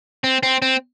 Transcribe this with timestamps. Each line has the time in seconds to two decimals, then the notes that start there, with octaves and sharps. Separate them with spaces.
0.24 C4
0.43 C4
0.62 C4